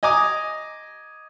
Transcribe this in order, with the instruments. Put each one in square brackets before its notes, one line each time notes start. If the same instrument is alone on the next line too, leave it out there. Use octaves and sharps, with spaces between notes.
[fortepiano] D#5 G#5 A#5 D6 D#6